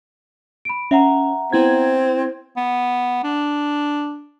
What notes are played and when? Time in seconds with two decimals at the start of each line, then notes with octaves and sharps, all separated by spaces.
0.65 B5 D7
0.91 C#4 E5 F#5 A#5
1.52 B3 C4 E4 G#6
2.57 B3
3.24 D4